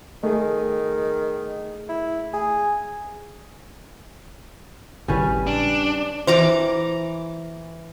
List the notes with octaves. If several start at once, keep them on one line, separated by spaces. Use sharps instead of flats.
D#3 A3 G#4
E4
G#4
G#1 A2 C#3 G3 C#4 B4
D4
E3 C5 A#5 D6